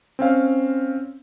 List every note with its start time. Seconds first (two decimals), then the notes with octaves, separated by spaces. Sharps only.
0.19 C4 C#4 F5